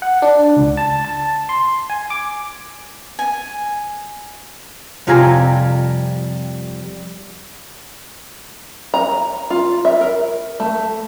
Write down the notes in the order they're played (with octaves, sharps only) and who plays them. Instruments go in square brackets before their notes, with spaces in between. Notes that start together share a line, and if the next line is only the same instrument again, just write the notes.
[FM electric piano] F#5
D4
C#2
A5
A5
C6
G#5
D6
[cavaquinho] G#5
[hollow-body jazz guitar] F2 C3 G3 F4 G#5 A#5
[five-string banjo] A#5
F4
E5
A#4
A3